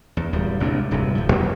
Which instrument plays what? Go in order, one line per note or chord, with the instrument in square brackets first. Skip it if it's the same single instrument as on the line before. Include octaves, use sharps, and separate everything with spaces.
[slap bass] E2
D1 E2 G3
A1 C3 G#3 D4
D1 G2 C3 G#3
D#1 F3
C2 F#2 A#2 F#3